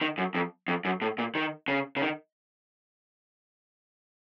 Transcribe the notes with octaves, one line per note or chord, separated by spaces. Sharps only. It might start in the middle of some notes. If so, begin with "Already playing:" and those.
D#3
F#2
F2
F2
F#2
A2
A#2
D#3
C#3
C#3
D#3